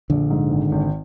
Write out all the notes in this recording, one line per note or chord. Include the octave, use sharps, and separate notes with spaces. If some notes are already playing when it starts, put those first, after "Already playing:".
A#1 D3
G#2
G#1
G#1